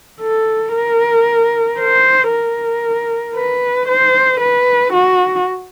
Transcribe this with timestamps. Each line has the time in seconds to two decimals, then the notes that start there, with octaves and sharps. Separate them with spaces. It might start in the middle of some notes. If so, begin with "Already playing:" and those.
0.21 A4
0.74 A#4
1.79 C5
2.31 A#4
3.35 B4
3.88 C5
4.40 B4
4.93 F#4